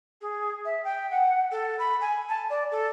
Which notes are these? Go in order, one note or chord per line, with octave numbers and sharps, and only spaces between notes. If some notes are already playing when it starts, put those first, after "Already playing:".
G#4
E5
G5
F#5
A4
B5
G#5
A5
D5
A4